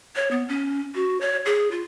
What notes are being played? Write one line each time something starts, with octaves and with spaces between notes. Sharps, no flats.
C#5
B3
C#4
F#4
C#5
G#4
F4